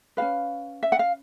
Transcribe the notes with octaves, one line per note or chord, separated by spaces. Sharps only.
C#4 F#4 B4 F5
E5
F#5
F5